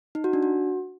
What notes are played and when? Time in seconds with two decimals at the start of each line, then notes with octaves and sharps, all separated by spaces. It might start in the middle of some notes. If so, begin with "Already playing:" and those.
0.15 D#4
0.24 F#4
0.33 D4
0.43 F#4